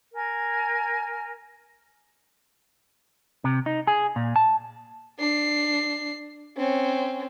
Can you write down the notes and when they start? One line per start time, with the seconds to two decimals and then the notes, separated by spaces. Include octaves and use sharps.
0.12 A#4 G#5
3.44 C3
3.66 D#4
3.87 G#4
4.16 A#2
4.36 A5
5.19 D4 C7
6.57 C4 C#4